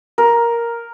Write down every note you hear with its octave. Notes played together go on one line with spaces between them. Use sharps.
A#4